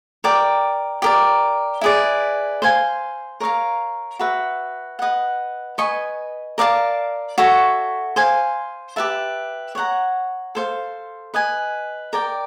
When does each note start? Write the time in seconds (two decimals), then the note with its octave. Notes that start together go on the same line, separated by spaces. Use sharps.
0.24 G4 A#4 D5 G5
1.02 G4 A#4 D5
1.81 E4 G#4 B4 D5
2.62 C5 F5 G#5
3.40 A#4 C#5 F5 A#5
4.19 F#4 B4 E5
4.99 B4 D#5 F#5
5.78 B4 D#5 G#5 C#6
6.58 A#4 D5 F5 A5
7.38 F#4 A4 C#5 E5
8.16 C5 F5 G#5
8.96 G4 B4 E5 A5
9.75 C#5 F#5 A#5
10.55 A4 C5 F5
11.34 B4 D#5 G#5
12.13 A#4 D5 G5